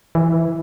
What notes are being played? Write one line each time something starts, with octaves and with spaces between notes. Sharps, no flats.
E3